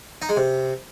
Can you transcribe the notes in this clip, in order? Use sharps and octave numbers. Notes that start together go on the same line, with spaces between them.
D#4
G#3
C3